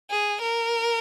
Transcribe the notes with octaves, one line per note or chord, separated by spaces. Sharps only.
G#4
A#4